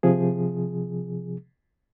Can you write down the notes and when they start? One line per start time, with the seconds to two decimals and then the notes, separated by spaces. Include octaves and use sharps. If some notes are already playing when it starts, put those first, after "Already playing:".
0.03 C3 F3 G#4